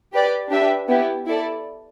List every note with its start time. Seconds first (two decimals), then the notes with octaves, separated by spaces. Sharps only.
0.13 G4 B4 D5
0.50 D4 G4 B4 E5
0.88 B3 E4 G4
1.26 E4 A4 D5